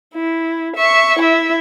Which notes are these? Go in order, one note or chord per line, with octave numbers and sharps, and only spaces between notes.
E4
E5 C#6
E4 E5